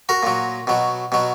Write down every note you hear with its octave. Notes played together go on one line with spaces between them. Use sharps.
F#4 A#4
A#2 F#3
B2 F#3
B2 F#3